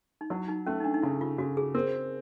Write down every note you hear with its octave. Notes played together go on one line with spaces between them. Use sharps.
D#4
F#3 E4
D#4
A3 C#4
D#4
D4
D#4
C#3 E4
F4
C#3 F#4
G#4
C4 A#4